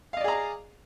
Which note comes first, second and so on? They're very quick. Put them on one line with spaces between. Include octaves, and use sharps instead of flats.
F5 D#5 D5 G#4 A#5